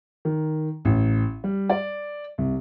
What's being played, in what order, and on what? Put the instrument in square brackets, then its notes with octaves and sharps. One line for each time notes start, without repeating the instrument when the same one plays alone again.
[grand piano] D#3
A1
G3
D5
C2